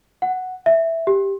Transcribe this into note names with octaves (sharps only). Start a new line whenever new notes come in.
F#5
E5
G4